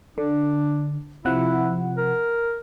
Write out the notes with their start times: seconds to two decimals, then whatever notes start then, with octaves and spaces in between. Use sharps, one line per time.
0.18 D3 D4
1.25 C3 F3 E4 F#5
1.98 A#4